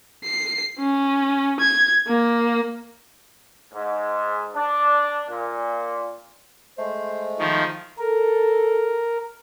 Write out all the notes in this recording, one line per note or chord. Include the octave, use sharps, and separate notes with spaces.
C7
C#4
G#6
A#3
G#2
D4
A#2
G#3 A3 C5
D#3 F3 C#6
A4 A#4